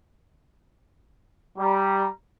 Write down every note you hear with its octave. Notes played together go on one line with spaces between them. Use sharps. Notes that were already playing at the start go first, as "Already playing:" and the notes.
G3 A#5